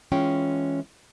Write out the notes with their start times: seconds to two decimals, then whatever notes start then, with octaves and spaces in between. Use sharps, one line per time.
0.12 E3 G#3 C#4 F4 G5